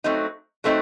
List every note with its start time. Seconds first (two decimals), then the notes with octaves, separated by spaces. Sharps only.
0.04 F#3 A3 C4 D#4
0.64 F#3 A3 C4 D#4